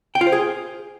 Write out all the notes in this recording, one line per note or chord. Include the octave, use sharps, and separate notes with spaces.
G5
F4
C5
G#4